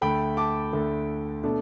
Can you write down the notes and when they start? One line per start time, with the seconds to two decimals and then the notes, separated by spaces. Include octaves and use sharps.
0.01 D2 D3 A3 G5 B5
0.37 A5 D6
0.73 D2 D3 A3
1.44 B2 A3 D4